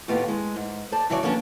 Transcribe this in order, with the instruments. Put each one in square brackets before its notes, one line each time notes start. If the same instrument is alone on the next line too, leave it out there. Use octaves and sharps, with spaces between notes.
[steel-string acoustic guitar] D#2 A2 B3 F4 G4
G#3
G#2
C5 D5 A5
C#3 E3 F#3 C#5 D5
F3 A#3 B3 C#4 D4